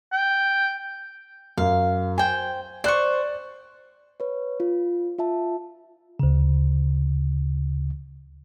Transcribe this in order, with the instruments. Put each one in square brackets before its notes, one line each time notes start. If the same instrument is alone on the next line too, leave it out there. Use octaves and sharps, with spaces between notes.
[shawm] G5
[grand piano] F#2 [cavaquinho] F5
[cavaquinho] C5 G5 [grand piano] G#5
[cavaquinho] C5 C#6 [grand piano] D5 F#6
[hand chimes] B4 C#5
F4
F4 E5 A5
[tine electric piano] D2 C#3